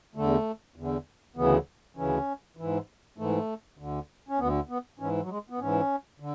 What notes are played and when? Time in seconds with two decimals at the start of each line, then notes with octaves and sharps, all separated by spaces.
0.15 E2 D3 A3
0.76 E2 D3
1.36 D2 C#3 E3 B3
1.97 D2 C#3 E3 C#4
2.57 G#2 E3
3.18 G#2 E3 A3
3.78 D2 D3
4.29 C#4
4.39 D2 D3 B3
4.69 B3
4.99 G#2 E3 C#4
5.22 F#3
5.29 G#3
5.50 B3
5.59 G#2 E3 C#4
6.20 D3